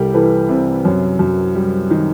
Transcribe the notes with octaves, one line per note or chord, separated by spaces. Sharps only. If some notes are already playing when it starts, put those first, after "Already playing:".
Already playing: C2 G3 G4 A4 A#4
E3 A4 B4
C3
F#2
F#2
G3
D#3